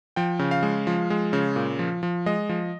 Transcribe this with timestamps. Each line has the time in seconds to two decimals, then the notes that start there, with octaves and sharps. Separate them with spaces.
0.16 F3 G5
0.39 C#3
0.51 F5
0.63 G#3
0.87 F3
1.10 G#3
1.33 C#3
1.56 A#2
1.79 F3
2.03 F3
2.26 G#3 D#5
2.49 F3